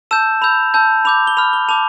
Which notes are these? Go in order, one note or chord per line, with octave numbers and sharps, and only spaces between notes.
A5 E6 G6 E7
B5 E6 G6 F7
A5 E6 G6
B5 D6 G6 F7
G7
B5 F6 F7
G7
A5 D6 G6 F7